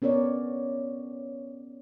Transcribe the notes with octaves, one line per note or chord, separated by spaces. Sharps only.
B3 C#4 A#4 C#5 D5